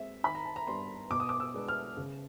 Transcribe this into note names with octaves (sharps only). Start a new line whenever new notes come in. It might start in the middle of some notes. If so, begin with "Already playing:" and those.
Already playing: G#3 C4 E5
D#3 B5
A#5
A5
A#5
G3 B3 D4 C6
B2 D6
D#6
D6
E6
G#3 B3 D4
F6
C#3